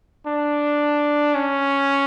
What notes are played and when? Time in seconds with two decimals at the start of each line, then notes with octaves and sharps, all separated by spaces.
0.26 D4
1.35 C#4